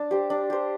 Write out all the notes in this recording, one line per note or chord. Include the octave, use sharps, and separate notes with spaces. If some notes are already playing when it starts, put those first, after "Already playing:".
Already playing: D4
G4 C5
D4
G4 C5